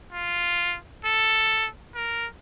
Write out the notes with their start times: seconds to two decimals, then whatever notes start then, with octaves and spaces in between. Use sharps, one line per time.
0.13 F4
1.05 A4
1.95 A#4